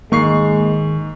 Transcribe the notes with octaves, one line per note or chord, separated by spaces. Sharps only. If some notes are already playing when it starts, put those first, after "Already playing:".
G#2 D#3 G#3 A#3 C#6 C7